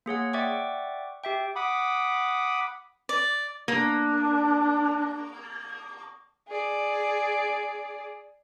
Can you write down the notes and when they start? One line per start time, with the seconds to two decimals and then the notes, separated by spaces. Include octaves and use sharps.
0.06 A#3 G#4 C#5 F#5
0.33 D5 E5 F#5 G5 C#6 D6
1.24 G4 E5 G5
1.56 F#5 B5 D6 D#6
3.09 D5
3.68 A#3 D4
6.48 G#4 D5